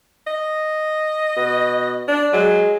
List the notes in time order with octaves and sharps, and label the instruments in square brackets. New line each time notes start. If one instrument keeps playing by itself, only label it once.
[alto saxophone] D#5
[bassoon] B2
[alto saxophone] D4
[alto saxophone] F#3 [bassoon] G#3